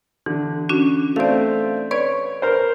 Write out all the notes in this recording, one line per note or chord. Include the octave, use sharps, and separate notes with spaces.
D3 E3
C#4 D4 F#4
A3 C4 D5 F5
B4 C#5 D5
A#4 C5